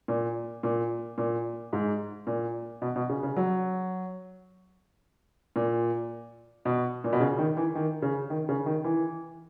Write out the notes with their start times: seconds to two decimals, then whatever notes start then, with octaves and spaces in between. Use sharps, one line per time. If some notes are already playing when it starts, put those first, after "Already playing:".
0.08 A#2
0.63 A#2
1.18 A#2
1.73 G#2
2.27 A#2
2.82 B2
2.96 B2
3.09 C#3
3.23 C#3
3.36 F#3
5.56 A#2
6.65 B2
7.04 A#2
7.13 B2
7.20 C#3
7.38 D#3
7.57 E3
7.75 D#3
8.02 C#3
8.30 D#3
8.49 C#3
8.66 D#3
8.84 E3